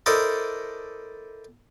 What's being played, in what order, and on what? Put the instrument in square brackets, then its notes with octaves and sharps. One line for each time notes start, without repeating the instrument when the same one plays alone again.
[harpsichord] E4 A4 A#4 C5 D5 D#5